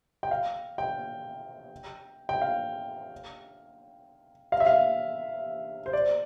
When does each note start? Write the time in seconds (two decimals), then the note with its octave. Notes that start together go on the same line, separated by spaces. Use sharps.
0.23 G5
0.31 F5
0.78 G5
2.29 G5
2.41 F5
4.52 F5
4.60 E5
4.66 F5
5.86 C5
5.93 D5